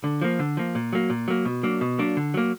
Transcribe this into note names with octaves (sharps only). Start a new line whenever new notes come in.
D3
F3 A#3
D3
F3 A#3
A#2
F#3 A#3
A#2
F#3 A#3
B2
F#3 A#3 D4
B2
F#3 A#3 D4
D3
F#3 A#3